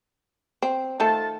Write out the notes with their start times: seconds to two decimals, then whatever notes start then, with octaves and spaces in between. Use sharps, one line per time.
0.62 C4
1.00 D#3 A3 F4 A4 A5